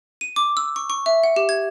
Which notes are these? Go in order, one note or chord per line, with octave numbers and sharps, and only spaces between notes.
D#7
D6
E6
C#6
C#6
E5
F#5
G4
G#6